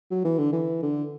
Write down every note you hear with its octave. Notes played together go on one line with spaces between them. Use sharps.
F#3
E3
D3
E3
D3